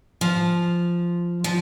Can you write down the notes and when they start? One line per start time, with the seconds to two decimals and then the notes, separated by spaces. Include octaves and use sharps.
0.21 F3
1.44 F3